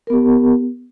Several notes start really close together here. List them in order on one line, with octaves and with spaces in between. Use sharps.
A#4 B3 G4